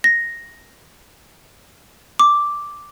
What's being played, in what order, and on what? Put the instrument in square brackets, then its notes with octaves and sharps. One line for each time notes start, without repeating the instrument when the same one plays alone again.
[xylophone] A#6
D6